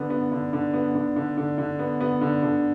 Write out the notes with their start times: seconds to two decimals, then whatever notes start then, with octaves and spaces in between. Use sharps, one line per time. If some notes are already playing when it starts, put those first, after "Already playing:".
Already playing: D3 B3
0.10 B3
0.32 D3
0.53 D3
0.74 B3
0.95 D3
1.16 D3
1.37 D3
1.58 D3
1.79 B3
2.01 B3
2.21 D3
2.43 D3